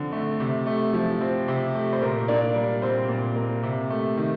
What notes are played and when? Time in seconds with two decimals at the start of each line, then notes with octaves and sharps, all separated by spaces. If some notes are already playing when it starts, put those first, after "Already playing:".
Already playing: D3 F3 C4
0.12 A3
0.40 C3
0.66 A3
0.93 F3
1.21 C4
1.48 C3
1.75 A3
1.93 C5
2.01 A#2 A#4
2.28 A#3 D4 D5
2.55 G3
2.82 A#2 C4 C5
3.09 A#2
3.36 A#3
3.63 C3
3.90 A3
4.17 D#3